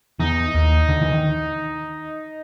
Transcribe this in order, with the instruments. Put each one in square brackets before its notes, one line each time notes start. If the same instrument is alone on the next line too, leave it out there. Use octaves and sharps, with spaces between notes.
[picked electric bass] E2 E3 [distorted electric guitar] D#4
[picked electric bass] D#2 D#3
D2 D3
E3
D#3